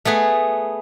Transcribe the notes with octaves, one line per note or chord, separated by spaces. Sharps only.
A3 B3 G#4 B4